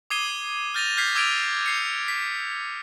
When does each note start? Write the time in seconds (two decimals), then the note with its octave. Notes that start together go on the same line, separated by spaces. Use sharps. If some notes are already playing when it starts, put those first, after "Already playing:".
0.10 D6 D#6 G#6 C7 D#7 G7
0.74 F6 G6 A6 A#6 D#7 F7
0.97 F6 G6 G#6 B6 C7
1.15 D6 E6 G#6 A6 D7 F7
1.66 G6 C7 C#7
2.08 B6